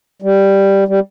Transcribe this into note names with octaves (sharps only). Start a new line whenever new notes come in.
G3
G3